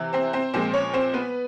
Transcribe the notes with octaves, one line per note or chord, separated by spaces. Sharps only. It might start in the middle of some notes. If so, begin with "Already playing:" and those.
Already playing: C3 E3
C4 C5
C4 C5
A#2 F3 G#3 C4 C5
C#4 C#5
C4 C5
B3 B4